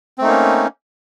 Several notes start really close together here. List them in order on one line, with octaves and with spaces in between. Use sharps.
C4 A3 D#4 A#3 C#4